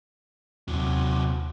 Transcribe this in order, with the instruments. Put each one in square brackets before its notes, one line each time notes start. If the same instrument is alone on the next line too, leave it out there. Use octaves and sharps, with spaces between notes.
[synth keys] D#2 [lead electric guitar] C3 F#3